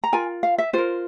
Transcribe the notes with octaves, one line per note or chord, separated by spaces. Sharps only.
A#5
F4 A#4 G#5
F5
E5
F4 A#4 C5